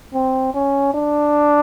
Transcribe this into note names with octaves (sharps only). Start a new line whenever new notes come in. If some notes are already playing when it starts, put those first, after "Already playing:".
C4
C#4
D4